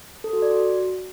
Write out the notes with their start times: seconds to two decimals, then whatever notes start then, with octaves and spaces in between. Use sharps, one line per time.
0.24 A4
0.33 F#4
0.42 D5
0.51 F#4